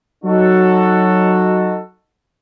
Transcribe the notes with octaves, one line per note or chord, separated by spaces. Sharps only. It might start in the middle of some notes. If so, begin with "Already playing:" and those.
F#3 D#4 F#4 A4